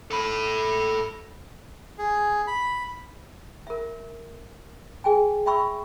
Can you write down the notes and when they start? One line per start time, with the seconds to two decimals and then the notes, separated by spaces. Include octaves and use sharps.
0.11 A4 B5
1.98 G#4
2.47 B5
3.67 A#4 E5
5.04 G#4 G5 G#5
5.46 E5 G5 B5 C#6 E6